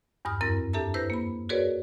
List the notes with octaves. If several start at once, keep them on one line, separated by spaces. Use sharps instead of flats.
E2 G2 D#6 F6
F#2 C4 E4 A#4 A#6
D4 G4 A4 E5 A5 A#5
E4 B4 C5 E6 G6 A#6
A#3 B5
F#4 G#4 A#4 B4 C#5 D5